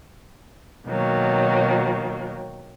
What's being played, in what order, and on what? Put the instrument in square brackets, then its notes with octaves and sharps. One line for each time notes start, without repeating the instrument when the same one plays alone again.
[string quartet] B2 D#3 F#3 A#3